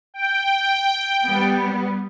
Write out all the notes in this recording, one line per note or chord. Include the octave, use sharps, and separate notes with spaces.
G5
G3 B3